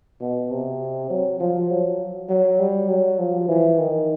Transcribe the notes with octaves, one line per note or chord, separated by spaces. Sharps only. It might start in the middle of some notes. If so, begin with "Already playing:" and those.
B2
C3
F#3
F3
F#3
F#3
G3
F#3
F3
E3
D#3